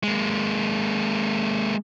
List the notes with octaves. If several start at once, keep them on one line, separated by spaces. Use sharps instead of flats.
G#3 A#3